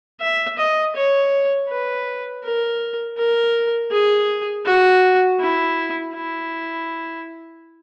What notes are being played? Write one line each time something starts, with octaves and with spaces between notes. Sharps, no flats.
E5
D#5
C#5
B4
A#4
A#4
G#4
F#4
E4
E4